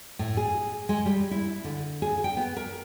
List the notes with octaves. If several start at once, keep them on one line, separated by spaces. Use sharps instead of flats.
A2
G#4
G#3
G3
E4
D3
G#4
G5
B3
A#4